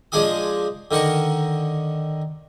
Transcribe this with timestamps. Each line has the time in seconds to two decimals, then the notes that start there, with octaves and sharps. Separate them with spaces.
0.12 F3 G#3 D4 G#4 G#5 D#6
0.91 D3 D#3 A#4 C#6